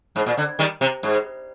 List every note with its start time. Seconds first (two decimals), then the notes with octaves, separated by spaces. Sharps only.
0.16 G#2
0.26 A#2
0.38 D3
0.59 D#3 G3
0.81 C3
1.03 G#2